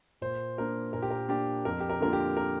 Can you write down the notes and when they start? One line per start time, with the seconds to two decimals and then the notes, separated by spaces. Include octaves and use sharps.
0.21 A#2 C5
0.57 A#3 D4 A#4
0.93 A#2 A#4
1.02 G4
1.10 A#4
1.29 A#3 D4 G4
1.65 F2 A#4
1.80 G4
1.90 A#4
2.01 D3 A#3 D4 F4 A#4
2.13 G4
2.37 A#4